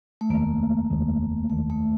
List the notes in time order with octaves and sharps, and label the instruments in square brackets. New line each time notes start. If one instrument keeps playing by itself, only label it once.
[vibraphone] A3
[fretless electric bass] F1 D#2 D#3 G#3 [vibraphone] A#3
[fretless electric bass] F1 D#2 D#3 G#3
[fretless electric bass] F1 D#2 D#3 G#3 [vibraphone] A3
[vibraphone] A3